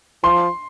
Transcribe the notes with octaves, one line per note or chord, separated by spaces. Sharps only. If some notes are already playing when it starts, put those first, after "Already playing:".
F3 C6